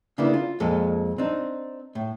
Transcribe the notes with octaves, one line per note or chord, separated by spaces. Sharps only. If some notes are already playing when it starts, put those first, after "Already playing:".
C#3 A#3 B3 D4 E4
F4
F2 A#2 G#3 A4
C4 D4 D#4
A2